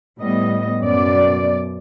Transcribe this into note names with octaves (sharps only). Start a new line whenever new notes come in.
A2 G3 B3 D#5
F#2 B2 D5